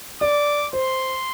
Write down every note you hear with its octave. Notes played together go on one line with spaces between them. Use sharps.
D5 D6
C5 C6